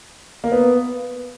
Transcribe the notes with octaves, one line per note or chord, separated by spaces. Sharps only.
A#3
B3